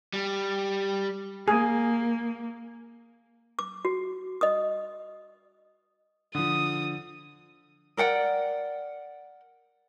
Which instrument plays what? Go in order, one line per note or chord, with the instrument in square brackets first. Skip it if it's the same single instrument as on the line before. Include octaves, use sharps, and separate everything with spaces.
[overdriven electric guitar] G3
[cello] A#3 [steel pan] G#4
[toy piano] D6
F#4
D#5 D#6
[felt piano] D3 F3 [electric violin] D#6
[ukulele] A#4 D5 F#5 G5